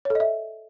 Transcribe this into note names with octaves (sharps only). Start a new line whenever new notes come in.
A4 C#5 D#5 E5